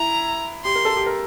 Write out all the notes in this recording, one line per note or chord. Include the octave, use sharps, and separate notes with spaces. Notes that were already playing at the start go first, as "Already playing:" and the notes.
Already playing: E4 A#5
G4 C6
A#4
A4
G4
A#4